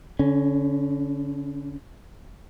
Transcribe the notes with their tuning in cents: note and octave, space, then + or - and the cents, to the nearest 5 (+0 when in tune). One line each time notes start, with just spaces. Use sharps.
D3 -35 C#4 +0